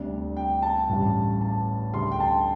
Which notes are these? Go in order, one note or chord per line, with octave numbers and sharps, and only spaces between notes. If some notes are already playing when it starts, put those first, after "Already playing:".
Already playing: D2 C3 G3 D4
G5
A5
A1 G2 G3
A5
D2 D3 G3 C6
G5
A5